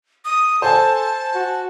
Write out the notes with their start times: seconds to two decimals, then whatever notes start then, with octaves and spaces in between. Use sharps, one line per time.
0.25 D#6
0.62 A4 C5 G#5 A5
1.35 F#4